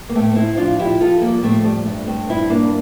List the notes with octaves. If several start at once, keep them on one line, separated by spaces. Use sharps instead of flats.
A#3
A2 A3 C4
C4 E4
F3 D4 F4
E4 G4
F3 F4 A4
G3 A#3
A2 A3 C4
G3
G2 A3
A3 C4
G2 C4 E4
A#3 D4